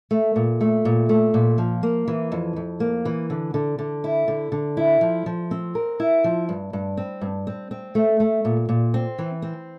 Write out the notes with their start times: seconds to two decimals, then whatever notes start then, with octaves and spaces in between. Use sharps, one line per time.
0.11 A3
0.36 A#2
0.61 A3
0.85 A#2
1.09 A3
1.34 A#2
1.58 F3
1.83 A#3
2.07 E3
2.32 F2
2.56 F2
2.80 A#3
3.05 E3
3.30 D3
3.54 D3
3.79 D3
4.04 E4
4.28 D3
4.52 D3
4.77 E4
5.01 F3
5.26 F3
5.51 C4
5.75 A#4
6.00 E4
6.24 F3
6.49 G2
6.73 G2
6.97 C4
7.21 G2
7.47 C4
7.71 C4
7.95 A3
8.20 A3
8.45 A#2
8.69 A#2
8.94 C4
9.19 E3
9.42 C4